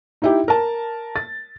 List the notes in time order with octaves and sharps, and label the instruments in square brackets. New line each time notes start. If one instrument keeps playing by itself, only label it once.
[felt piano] D#4 E4 G4
A#4 A5
A6